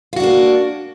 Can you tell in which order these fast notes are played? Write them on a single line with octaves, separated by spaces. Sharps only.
F4 F#4 D4 A#3